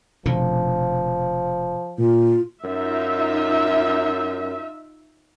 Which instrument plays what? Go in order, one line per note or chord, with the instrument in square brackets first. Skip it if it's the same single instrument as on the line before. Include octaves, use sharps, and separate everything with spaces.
[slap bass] F1 B2 D3 [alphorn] F3
[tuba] A#2 [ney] F4
[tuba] F#2 [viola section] D#4 F4 E5